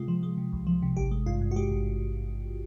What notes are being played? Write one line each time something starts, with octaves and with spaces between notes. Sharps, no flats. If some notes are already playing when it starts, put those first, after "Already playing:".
Already playing: C3 G#3 F4
F3
G#3
C3
C2
F3
C3
G#1 G4
G#3
G2 F4
G2
F#4
G#3 G4
G#1